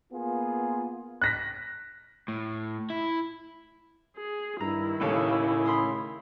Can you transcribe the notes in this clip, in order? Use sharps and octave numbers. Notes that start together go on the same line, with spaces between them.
A#3 B3 F4 G#4
F#6 A#6 B6
A2
E4
G#4
G2 D#3 E4 A#5
D#2 A2 C#3 A4 C#5
B5 C6 D#6